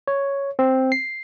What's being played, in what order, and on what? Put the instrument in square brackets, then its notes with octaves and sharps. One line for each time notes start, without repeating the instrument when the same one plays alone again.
[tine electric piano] C#5
C4
C7